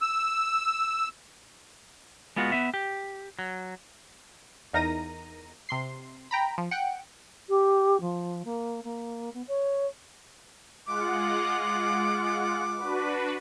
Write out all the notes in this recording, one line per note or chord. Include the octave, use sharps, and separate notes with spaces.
E6
G#3 B3 F4 F#4
B3 E5
G4
F#3
E2 D#4 A#4 A#5 A#6 D#7
C3 C6 C7
G5 A#5 B5
F3
F#5 G5 F#6
G4
F3
A#3
A#3
B3
C#5
G#3 F4 F#5 D6
D4 F#4 B4